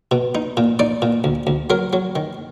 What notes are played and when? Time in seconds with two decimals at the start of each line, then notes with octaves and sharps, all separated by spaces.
0.11 B2
0.35 D#4
0.57 A#2
0.79 D#4 D5
1.02 A#2
1.24 D2
1.47 D2
1.70 F#3 A#4
1.93 F#3
2.16 D#3